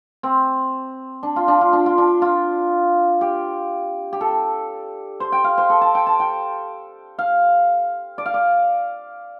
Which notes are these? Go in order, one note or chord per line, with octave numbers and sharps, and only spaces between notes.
C4
D4
F4
D4
F4
D4
F4
D4
F4
G4
G4
A4
C5
G5
F5
C5
A4
A5
G5
A5
G5
F5
D5
F5
D5